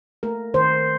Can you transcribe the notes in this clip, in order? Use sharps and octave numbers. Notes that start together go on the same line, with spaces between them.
A3 A#4
D#3 C5